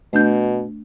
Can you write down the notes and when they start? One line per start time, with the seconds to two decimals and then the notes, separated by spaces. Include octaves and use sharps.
0.13 B2 A3 D4 G6